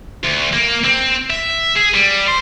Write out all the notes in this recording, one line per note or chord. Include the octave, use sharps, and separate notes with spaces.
D2
A#3
C4
E5
G#4
G3
C5